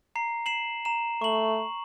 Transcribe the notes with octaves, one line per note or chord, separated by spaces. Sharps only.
A#5 C7
C7 E7 F#7
A#5 E7
A3 C#6 F#7